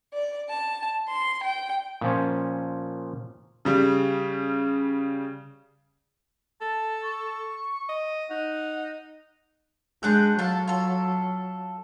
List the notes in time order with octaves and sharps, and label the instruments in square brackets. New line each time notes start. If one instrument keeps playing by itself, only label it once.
[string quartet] D5
A5
C6
G5
[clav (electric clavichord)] A#2 F3 C#4
[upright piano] C#3 G3
[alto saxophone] A4 [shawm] A5
[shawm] C#6
[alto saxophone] D#5
[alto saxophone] D#4 [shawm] F#5
[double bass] G#3 [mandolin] D4 F#5 G6
[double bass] F#3 [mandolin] F4 A4 A5
[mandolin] F4 A4